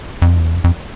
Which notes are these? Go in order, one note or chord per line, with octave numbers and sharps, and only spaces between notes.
F2
E2
F2
F2